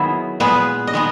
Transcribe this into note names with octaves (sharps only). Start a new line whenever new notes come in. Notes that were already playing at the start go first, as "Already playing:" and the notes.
Already playing: D#3 F#3 B3 E4 G#4
A#2 G#3 B3 G#4 B4
D#5
D#3 G#3 B3